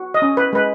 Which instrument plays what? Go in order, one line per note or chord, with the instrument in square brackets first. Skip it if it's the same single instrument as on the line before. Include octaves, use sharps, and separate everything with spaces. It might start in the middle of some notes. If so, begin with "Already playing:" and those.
Already playing: [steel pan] F#4
D#5
C#4
B4
G#3 B4